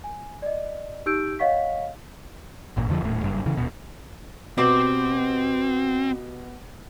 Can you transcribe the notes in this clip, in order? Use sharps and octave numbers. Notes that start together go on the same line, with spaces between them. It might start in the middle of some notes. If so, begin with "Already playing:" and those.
G#5
D5 D#5
D#4 G4 E6 G6 D7
C#5 D#5 F5 F#5 C#6 B6
G#1 A#2
F2 D3 D#3 F3
D#1 A2
F#1 G2
C#3 E3
D#1 B2
B2 C4 G4 D5 C6